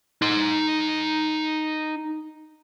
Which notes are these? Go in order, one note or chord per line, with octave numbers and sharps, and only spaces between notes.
D#4 C6